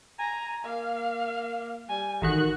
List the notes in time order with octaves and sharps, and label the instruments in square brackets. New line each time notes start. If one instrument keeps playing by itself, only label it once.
[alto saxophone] G#5 [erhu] A#5
[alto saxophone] A#3 [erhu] F5
[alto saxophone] G3 [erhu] G#5
[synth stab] A1 D#3 F#6 [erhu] F#4